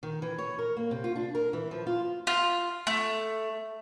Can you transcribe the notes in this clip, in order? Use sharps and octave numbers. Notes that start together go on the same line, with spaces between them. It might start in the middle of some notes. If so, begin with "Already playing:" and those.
D#3
E3
C#5
A#4
A#3
C3
F4
D4
A#4
E3
F3
F4
F4
A3